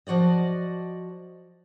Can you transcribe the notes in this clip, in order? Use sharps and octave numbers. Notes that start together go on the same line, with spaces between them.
F3 F#4 D5 D#5